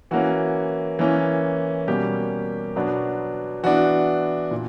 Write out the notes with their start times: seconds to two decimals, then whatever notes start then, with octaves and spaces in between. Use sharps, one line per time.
0.11 E3 A#3 C#4 F#4
0.99 E3 A#3 C#4
1.87 B2 G3 A#3 C#4 G4
2.76 B2 F#3 B3 D4
3.63 E3 B3 D4 F#4
4.51 A#2